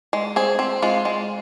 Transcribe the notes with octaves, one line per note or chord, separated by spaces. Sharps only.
G#3
C4 G#4
C4
G#3 F4
G#3